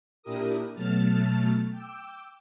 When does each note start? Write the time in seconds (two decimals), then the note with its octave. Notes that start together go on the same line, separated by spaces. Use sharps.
0.23 A#2 D4 E4 G4 A#4 D#6
0.74 B2 F#3 A3 A5 F6 A6
1.71 G5 D6 E6